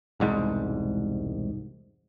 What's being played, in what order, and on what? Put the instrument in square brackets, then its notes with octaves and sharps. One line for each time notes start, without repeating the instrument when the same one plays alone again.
[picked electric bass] E1 C2 G#2